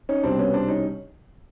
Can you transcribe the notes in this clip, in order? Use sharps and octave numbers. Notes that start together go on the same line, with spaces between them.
C#4 D#4
C2 B2 G3 C4 D4
B3 C#4
C4 D4
C#4 D#4